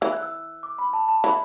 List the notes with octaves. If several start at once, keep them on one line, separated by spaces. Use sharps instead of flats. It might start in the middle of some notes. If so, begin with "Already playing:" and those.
E3 E6
F#6
E6
D6
B5
A5
A5
E3 B5